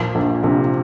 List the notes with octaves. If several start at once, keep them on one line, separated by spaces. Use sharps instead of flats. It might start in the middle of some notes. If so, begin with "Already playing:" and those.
Already playing: A#2 F3 A#3
A#1
A#1 C3